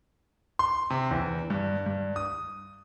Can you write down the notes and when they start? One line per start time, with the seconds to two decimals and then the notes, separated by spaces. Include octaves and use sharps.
0.59 C6
0.90 C3
1.11 E2
1.50 G2
1.86 G2
2.16 D#6